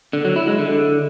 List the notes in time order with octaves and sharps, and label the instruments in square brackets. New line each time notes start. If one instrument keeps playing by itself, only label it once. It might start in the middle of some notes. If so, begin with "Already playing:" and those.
[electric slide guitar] D3
F#3
E4
G#3
D3